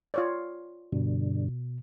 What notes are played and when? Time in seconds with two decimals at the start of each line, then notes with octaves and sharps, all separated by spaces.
0.14 F4 C#5 D5
0.92 G2 B2 D3